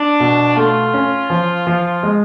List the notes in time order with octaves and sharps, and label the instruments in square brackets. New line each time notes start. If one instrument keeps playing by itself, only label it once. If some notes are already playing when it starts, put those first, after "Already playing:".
Already playing: [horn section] D4
[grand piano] B2
[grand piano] A3 [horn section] F4
[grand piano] C#4
F3
F3
G#3